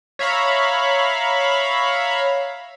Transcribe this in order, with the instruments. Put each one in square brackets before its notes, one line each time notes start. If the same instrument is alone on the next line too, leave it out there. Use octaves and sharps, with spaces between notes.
[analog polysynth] C#5 E5 F5 A#5 B5